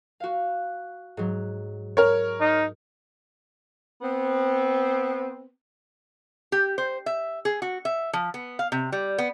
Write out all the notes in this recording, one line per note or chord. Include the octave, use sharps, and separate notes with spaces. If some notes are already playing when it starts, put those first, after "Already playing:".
F#4 F5
G#2 F#3
A#4 C#5
D#4
B3 C4
G4
C5
E5
G#4
F#4
E5
F3
B3
F5
C3
G3
B3